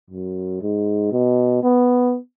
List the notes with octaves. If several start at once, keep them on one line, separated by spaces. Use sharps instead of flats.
F#2
G#2
B2
B3